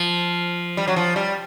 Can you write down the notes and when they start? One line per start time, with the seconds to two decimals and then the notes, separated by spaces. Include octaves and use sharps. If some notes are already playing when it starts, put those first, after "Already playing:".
Already playing: F3
0.77 G3
0.88 F#3
0.96 F3
1.16 G3